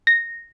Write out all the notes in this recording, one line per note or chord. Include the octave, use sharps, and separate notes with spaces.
A#6